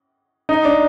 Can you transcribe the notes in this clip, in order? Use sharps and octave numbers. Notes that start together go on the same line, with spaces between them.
D#4
D4